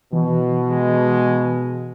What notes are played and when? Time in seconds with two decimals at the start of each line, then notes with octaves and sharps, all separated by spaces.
0.13 B2 E3
0.71 G#3